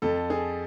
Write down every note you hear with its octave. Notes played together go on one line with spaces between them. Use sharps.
F2 A4
G#4